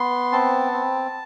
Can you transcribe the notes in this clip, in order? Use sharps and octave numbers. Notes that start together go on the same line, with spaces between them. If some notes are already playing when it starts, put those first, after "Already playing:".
Already playing: B3 C6
C4 A5
C4